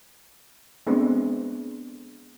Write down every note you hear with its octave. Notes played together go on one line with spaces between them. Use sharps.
G#3 A3 B3 C4 D4